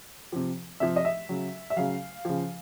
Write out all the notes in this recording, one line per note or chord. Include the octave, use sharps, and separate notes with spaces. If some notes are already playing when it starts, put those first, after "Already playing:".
C3 F3
C3 F3 E5
D#5
E5
C#3 F#3
E5
C#3 F#3 F5
C#3 F3